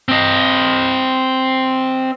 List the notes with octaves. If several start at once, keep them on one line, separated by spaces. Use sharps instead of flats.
C4 D#5